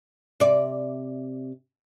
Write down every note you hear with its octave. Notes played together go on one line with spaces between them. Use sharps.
C3 D5